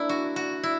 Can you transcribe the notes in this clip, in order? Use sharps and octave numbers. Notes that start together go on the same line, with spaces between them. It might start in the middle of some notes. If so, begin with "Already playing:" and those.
Already playing: A#3 D4 E4
F#4
F#4
E4